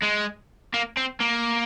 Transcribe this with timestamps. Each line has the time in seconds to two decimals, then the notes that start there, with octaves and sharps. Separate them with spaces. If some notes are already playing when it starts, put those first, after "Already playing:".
0.03 G#3
0.74 A#3
0.97 C4
1.20 A#3